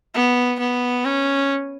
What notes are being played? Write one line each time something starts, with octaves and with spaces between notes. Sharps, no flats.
B3
B3
C#4